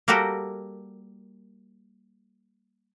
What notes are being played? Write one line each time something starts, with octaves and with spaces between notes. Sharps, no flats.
G3 A#3 F#4 G4 A4 A#4